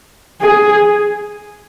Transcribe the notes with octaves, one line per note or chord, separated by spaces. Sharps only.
G#4